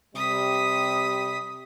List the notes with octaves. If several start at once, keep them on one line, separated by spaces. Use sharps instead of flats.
C3 G3 D#6 B6